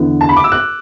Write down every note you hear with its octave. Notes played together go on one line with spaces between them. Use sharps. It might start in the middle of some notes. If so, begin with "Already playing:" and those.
Already playing: E2 D3 B3 E4
A5
B5
D6
E6
F#6